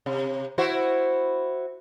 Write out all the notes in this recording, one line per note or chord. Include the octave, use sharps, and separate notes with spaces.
C3
E4 F#4 C5